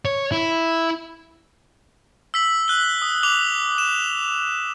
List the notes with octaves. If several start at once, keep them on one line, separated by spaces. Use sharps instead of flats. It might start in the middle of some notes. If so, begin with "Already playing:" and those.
C#5
E4
E6 B6 F#7
F#6 G7
D#6
D6 E6 F7 G7
E7